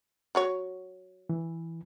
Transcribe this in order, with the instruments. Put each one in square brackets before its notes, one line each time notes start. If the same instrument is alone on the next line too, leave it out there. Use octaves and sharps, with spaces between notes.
[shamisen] F#3 F#4 C#5
[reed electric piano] E3